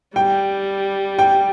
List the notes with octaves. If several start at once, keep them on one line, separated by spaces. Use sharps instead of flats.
G3 G5
G5